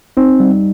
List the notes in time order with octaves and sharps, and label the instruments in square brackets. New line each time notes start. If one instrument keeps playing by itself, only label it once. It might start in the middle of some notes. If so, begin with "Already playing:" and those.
[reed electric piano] C4 [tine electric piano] D#4
[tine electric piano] G3